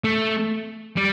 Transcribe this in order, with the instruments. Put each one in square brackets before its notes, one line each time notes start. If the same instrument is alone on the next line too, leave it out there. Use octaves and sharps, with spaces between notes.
[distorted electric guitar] A3
G3